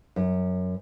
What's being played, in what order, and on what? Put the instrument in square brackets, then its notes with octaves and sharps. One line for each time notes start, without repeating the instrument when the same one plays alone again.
[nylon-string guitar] F#2